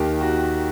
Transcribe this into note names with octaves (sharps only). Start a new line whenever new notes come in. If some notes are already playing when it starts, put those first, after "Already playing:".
Already playing: D#2 D#3 G4
F#4